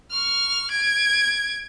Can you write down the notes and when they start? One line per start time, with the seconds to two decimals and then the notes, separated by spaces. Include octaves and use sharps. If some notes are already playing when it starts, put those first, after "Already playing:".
0.11 C#6 F6
0.71 G#6 D7